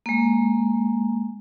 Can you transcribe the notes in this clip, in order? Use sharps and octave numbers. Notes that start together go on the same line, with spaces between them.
G#3 A#3